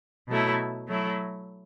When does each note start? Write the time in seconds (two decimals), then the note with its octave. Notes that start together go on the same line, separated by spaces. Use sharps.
0.28 B2 F#3 A3 E4
0.87 F#3 A3 E4